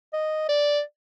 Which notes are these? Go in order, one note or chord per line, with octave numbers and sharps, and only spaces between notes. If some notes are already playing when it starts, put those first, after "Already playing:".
D#5
D5